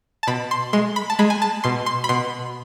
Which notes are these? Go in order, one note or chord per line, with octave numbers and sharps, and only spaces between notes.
A5
B2 B5
C6
G#3 C6
B5
A5
G#3 B5
G#5
A5
B2 C6
C6
B5
B2 C6